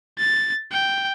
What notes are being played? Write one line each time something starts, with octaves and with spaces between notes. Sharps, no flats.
A6
G5